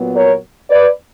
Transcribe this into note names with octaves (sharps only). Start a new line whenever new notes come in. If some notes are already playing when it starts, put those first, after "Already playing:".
Already playing: A#2 F#3 B3
A#4 C#5
B4 D5